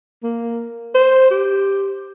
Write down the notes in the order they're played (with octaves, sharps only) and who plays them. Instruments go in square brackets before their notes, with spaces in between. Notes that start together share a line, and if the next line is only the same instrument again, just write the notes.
[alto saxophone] A#3
C5
G4